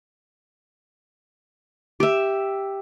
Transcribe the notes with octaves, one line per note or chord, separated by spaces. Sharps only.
G4 E5